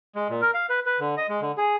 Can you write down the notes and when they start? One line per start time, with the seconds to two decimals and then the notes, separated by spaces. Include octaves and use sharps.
0.15 G#3
0.30 A#2
0.42 A#4
0.54 F5
0.70 B4
0.86 B4
1.00 D3
1.17 D#5
1.29 G#3
1.41 D3
1.58 G#4